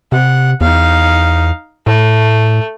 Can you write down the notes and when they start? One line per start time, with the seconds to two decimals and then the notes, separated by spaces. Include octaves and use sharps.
0.12 C3 F#5
0.61 E2 D#4 F5
1.87 A2 A3